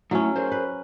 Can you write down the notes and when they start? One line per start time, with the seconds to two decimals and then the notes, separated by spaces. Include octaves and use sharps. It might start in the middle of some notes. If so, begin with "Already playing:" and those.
0.11 F#3 A3 C#4 D#4 E4
0.36 G#4 A#4 C5
0.52 B4